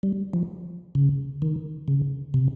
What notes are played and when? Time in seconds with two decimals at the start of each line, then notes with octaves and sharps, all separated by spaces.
0.03 G3
0.34 F3
0.95 C#3
1.42 D#3
1.88 C#3
2.34 C3